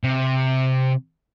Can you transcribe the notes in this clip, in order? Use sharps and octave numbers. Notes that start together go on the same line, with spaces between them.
C3